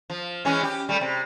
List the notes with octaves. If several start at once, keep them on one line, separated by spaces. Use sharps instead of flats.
F3
E3 G#3 C#4
G4
G3 A3
C3